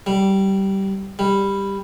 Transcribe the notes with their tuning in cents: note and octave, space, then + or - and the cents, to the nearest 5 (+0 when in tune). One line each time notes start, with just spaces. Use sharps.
G3 -15
G3 +10